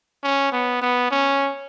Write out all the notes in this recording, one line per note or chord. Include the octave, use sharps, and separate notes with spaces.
C#4
B3
B3
C#4